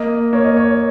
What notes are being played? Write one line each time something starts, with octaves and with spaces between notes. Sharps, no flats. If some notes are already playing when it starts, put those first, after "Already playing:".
Already playing: A#3 D#5
A#3 C#5
D#5
C#5